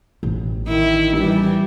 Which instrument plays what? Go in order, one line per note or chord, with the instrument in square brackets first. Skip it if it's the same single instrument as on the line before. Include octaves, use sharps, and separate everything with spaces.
[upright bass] A1
[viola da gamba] D#3 E4
E3 G3